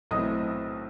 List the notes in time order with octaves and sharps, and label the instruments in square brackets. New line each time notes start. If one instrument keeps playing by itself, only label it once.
[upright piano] B1 A2 E3 A3 C4 D#5 D#6